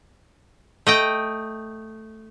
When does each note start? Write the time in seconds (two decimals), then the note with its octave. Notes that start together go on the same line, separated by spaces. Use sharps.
0.87 A3 D#5 G5